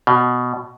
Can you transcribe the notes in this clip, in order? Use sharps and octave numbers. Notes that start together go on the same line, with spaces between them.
B2